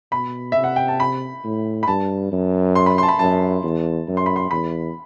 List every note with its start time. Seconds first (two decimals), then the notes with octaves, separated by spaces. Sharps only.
0.12 B2 B5
0.52 C3 E5
0.64 F#5
0.76 G5
0.88 A5
1.00 B5
1.44 A2
1.83 B5
1.88 G2 A5
2.32 F#2
2.76 C6
2.86 B5
2.98 A5 C6
3.08 B5
3.19 F#2 A5
3.63 E2
4.08 F#2
4.17 C6
4.26 B5
4.36 C6
4.51 E2 B5